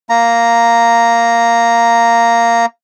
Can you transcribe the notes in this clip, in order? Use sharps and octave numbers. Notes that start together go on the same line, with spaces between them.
A#3 A#5